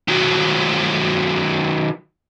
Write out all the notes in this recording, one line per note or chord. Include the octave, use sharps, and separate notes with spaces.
D#3 F#3